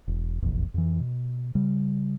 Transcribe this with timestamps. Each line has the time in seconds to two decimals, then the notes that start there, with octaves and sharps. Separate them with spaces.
0.08 E1
0.42 F1 A#1 E2
0.74 F2 E3
1.00 B2
1.55 C#3 G3